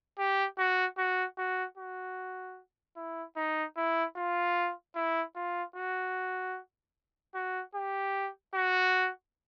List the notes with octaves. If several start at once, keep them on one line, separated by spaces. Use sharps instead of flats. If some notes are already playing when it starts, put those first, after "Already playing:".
G4
F#4
F#4
F#4
F#4
E4
D#4
E4
F4
E4
F4
F#4
F#4
G4
F#4